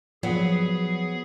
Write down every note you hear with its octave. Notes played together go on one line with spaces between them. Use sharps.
F3 F#3 B3 G#4